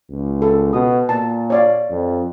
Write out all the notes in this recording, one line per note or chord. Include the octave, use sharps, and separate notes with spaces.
C#2
A4
B2 D#6
A#2 A5
C#5 D5 F5
F2